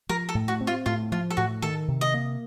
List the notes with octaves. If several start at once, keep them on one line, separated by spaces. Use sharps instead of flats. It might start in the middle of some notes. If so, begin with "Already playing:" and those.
F3 A#4
A4
A2
F#4
C4
F4
A2 F4
F3 F4
A4
A2 F#4
D#3 A4
C3
D#5
A#3